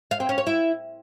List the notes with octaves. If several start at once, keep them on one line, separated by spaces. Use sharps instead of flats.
F5
C4
C#4
C#5
E4